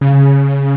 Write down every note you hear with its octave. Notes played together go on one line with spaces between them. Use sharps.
C#3